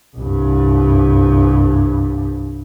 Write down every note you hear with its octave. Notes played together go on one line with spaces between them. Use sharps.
C2 G2